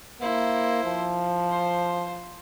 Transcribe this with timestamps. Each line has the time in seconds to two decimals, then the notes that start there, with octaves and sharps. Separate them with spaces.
0.21 A#3 E4 C5
0.85 F3
1.50 C5